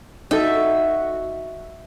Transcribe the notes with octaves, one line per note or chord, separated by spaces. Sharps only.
D#4 F#4 A4 E5